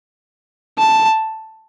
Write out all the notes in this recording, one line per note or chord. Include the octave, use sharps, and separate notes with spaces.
A5